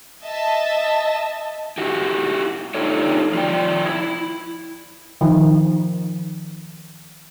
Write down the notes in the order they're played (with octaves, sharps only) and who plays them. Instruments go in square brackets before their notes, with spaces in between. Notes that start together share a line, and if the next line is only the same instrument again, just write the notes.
[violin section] D#5 E5 A5
[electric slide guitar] E4 F#4 G4
D4 D#4 F4 G4 A4 C#5
F3 F4 D5 G5
E4
[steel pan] D#3 F3